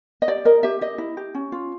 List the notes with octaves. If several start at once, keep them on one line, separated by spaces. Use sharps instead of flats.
D#5
G4 D5
A#4 D#5
G4 E5
G4 D#5
E4
G4
C#4
F4